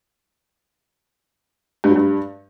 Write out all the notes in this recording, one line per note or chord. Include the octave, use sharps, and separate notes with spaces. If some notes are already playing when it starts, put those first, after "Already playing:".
G2
F#3
G2